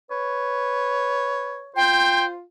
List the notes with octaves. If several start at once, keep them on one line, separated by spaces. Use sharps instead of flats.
B4 C#5
F4 C5 G5